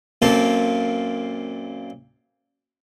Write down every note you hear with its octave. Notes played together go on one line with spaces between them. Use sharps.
F#2 A#2 A#3 C4 A4